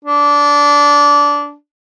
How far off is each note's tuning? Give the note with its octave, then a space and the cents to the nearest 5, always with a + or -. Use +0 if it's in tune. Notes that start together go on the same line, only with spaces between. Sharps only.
D4 -20